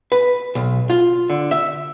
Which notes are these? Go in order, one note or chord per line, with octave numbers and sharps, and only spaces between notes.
B4
B1
F4
D3
E5